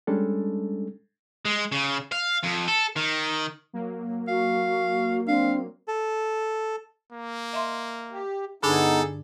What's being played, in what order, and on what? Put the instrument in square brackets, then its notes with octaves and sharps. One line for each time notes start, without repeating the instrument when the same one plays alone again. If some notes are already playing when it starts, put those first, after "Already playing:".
[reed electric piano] G3 G#3 C#4 D4 A4
[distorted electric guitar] G#3
C#3
F5
F2
A4
D#3
[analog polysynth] F#3 A#3
[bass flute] F#4 [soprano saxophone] F5
[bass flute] C4 [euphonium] D4 [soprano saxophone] F5
[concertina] A4
[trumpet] A#3
[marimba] D#5 E5 C6
[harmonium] G4
[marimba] G2 D3 D4 [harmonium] B3 D#4 [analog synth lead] G#4 [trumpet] A4